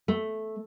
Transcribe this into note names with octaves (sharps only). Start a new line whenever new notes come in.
A3